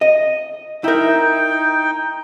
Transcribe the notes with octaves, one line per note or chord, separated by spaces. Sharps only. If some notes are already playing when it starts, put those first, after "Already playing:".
D#5
D#4 E4 A#4 G5